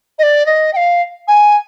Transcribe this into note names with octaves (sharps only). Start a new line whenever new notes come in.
D#5
D5
D#5
G5
F5
G#5